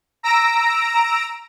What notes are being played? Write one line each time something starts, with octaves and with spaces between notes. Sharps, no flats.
A#5 E6 A#6 D7